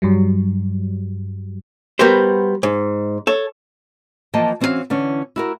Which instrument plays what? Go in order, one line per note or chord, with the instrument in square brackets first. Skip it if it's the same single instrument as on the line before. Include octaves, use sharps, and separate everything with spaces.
[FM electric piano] G2 F#3 G3
[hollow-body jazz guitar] G3 B3 F#4 A#4 C5
G#2
A4 C#5
[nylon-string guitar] E3 F3 A#3 D#5 G5 A5
E3 C4 C#4 E4 F#4 F5
D3 E3 C#4
E4 F#4 A#4